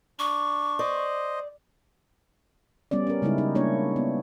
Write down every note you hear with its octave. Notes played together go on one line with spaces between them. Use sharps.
D4 C#6
C5 D5 D#5
G3 B3 C#4 D5
C#4 A#4
C#3 G3 G#3 D#4 E4
D#4
A#3 D4 E4 C#5
B3